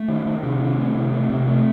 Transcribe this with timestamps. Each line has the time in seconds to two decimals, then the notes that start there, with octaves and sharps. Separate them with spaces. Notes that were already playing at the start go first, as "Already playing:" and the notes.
Already playing: A3
0.08 D#3
0.26 D#3
0.43 C3
0.60 D#3
0.77 A3
0.95 C3
1.12 A3
1.29 C3
1.47 A3